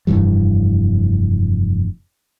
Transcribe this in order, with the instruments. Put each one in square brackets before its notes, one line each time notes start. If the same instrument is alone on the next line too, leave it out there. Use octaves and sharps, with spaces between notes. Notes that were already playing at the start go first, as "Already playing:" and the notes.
[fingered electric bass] F1 G2 E3 G3